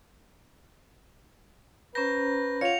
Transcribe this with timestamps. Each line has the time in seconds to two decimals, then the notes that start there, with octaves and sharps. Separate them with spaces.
1.95 C#4 B4 C5 A#5 G6 A#6
2.61 F4 C#5 F5 F#5 C#7 F7